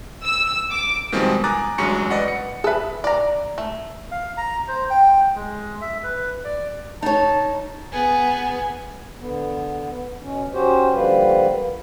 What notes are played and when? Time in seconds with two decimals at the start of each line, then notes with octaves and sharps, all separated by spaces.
0.23 E6
0.71 D6
1.12 B2 D#3 F3 G3 G#3 C4
1.44 G#5 A#5 D6 D#6 F#6 A6
1.78 A1 G2 F#3 G#3 C#6 C#7
2.11 B4 D5 D#5 F#5
2.28 C#7
2.64 G#4 A4 B4 E5
3.04 D5 A#5
3.58 A3
4.11 F5
4.37 A#5
4.68 C5
4.90 G5
5.35 G#3
5.81 E5
6.04 B4
6.45 D5
7.03 D#4 C#5 A5
7.92 B3 G#4
9.21 D3 B3
10.22 B2 C#4
10.54 C#4 F#4 G4 C5
10.94 D3 F3 G3 A#3 B4